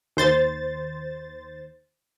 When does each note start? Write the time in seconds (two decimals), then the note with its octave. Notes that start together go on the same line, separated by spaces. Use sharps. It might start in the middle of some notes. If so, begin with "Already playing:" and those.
0.17 D#2 C5 A6